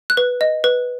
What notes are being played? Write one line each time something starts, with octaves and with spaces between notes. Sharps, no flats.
F#6
B4
D#5
B4